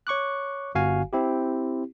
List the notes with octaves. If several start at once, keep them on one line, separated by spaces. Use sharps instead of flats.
C#5 C#6 D6 F#6
G1 F#4 F5 G#5
C4 E4 G4